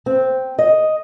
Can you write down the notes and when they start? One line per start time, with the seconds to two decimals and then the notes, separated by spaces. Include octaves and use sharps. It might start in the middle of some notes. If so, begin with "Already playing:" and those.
0.06 C4
0.59 D#5